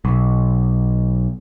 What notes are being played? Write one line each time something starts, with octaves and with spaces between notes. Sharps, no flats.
B1